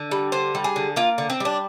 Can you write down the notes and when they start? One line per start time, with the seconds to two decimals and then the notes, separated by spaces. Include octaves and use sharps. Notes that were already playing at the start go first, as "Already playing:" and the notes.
Already playing: D3
0.11 G3
0.32 D3 C5
0.55 G3
0.64 G#4
0.76 D3
0.96 A#3 F4
1.18 D3
1.30 C4
1.40 G3 D4